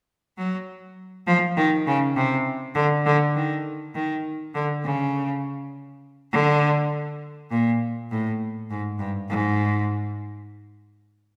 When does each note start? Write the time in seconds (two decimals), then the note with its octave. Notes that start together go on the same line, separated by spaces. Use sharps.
0.38 F#3
1.27 F3
1.57 D#3
1.87 C#3
2.16 C3
2.75 D3
3.06 D3
3.35 D#3
3.95 D#3
4.54 D3
4.84 C#3
6.32 D3
7.51 A#2
8.11 A2
8.71 G#2
8.99 G2
9.29 G#2